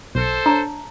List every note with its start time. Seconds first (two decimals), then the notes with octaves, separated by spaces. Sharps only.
0.15 B1 A4 C5
0.46 D4 C#5 A5 A#5